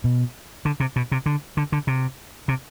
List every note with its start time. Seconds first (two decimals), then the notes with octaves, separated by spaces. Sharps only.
0.04 B2
0.65 D3
0.80 C3
0.96 B2
1.12 C3
1.26 D3
1.57 D3
1.72 D3
1.87 C3
2.48 C3